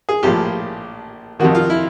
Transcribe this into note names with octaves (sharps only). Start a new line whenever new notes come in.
G#4
A#1 A2 F3 G4
F2 C3 D#3 F#4
F4
E4